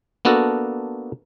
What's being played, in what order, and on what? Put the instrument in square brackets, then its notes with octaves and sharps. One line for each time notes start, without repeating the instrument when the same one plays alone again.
[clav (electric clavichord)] A#3 B3 D4 F#4 A4 A#4